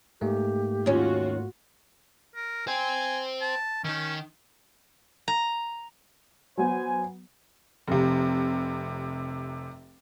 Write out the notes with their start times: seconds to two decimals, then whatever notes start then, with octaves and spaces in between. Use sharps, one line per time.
0.21 G#2 A3 A#3 G4
0.86 D#2 C#4 F4 F#4
2.35 A#4
2.67 C5 G5 G#5
3.42 A5
3.84 D#3 C#4 D#4
5.28 A#5
6.58 F#3 B3 C5 G#5
7.88 F1 C3